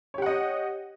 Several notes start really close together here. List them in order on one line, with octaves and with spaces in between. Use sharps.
C#5 G4 F#5 D#5